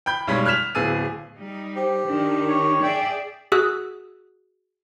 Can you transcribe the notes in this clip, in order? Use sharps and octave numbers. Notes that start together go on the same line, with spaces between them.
G5 B5 G6
B1 G3 G#3 C#5 B5 B6
F6 F#6 G#6 B6 E7 F7
D1 B3 G#4 E6 A6 D#7
G3 D#4
G4 C5
D#3 D4
C#5
G#4 D5 E5 G5
F#4 G#4 D#6 E6 F#6